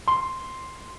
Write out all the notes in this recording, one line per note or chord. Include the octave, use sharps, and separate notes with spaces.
C6